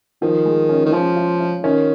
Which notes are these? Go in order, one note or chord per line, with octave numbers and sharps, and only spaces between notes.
D#3 F3
G#3
C#4
D#3
F3 C#4
F4
F4
D#3 C#4